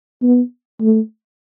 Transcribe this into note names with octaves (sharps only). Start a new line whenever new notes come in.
B3
A3